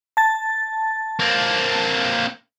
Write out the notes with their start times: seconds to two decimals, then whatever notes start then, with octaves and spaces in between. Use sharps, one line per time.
0.17 A5 A6
1.20 A#3 C4